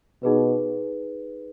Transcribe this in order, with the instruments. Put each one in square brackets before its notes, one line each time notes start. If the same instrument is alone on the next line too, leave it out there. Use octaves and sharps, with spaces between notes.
[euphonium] B2 [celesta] D#4 G#4 B4